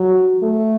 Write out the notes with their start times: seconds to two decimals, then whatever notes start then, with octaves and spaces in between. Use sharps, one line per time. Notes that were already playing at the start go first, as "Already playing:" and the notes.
Already playing: F#3
0.43 A3